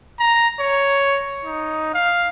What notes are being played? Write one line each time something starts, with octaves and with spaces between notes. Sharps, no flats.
A#5
C#5
D#4
F5